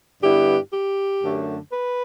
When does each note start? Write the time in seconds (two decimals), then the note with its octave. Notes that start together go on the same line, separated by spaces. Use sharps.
0.22 G2 D3 G3 B3 E4 G4
0.72 G4
1.22 F#2 D3 A3
1.72 B4